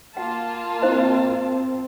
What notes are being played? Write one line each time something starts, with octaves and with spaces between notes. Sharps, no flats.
A#3 F4 F#5 A5
C4 E4 C5 D#5